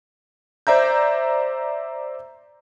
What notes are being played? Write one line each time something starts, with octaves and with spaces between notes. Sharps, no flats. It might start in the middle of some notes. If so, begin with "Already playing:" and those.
C5 D5 E5 A#5 G6